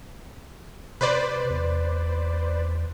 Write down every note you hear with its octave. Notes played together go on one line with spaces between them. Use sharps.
C3 B4 C5 D5
E2